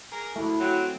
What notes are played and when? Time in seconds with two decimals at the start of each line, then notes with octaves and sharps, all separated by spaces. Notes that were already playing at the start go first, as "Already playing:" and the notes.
0.11 G#4 A#4
0.36 D2 A3 E4
0.59 F#3 C4